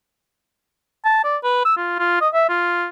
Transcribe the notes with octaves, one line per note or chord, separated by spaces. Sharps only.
A5
D5
B4
E6
F4
F4
D#5
E5
F4